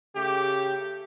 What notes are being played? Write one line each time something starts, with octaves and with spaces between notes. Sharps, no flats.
C#3 A3 G4